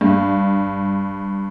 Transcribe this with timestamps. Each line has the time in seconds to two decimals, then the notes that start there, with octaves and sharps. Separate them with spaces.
0.01 G2